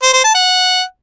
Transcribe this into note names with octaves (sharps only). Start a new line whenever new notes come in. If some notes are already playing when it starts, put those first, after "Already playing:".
C5
C5
A5
F#5